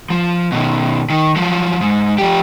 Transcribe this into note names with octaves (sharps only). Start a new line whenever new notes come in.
F3
B2 D#3
D#3
F3 F#3
G#2
F3 G4